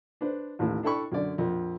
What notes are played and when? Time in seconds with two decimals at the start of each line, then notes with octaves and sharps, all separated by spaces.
0.21 D4 B4 C5
0.59 A1 D#2 A2
0.83 D4 E4 A4 G5 B5 C#6
1.12 F#2 D3 D5
1.38 A#1 F2